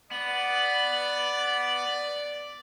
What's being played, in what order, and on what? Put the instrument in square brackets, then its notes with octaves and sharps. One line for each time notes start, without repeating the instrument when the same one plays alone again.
[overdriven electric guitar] B3 [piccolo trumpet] D5 [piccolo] F#7